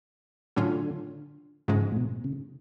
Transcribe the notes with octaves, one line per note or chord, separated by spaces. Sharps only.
A2 D3 F#3 A3 C#4 F4
G#2 C#3 F3 G#3
A2
B2
C#3